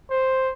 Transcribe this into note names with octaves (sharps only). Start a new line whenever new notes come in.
C5